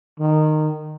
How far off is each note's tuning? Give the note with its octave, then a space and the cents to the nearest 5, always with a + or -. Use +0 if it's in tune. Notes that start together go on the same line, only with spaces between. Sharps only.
D#3 -15